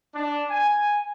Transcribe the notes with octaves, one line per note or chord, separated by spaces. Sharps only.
D4
G#5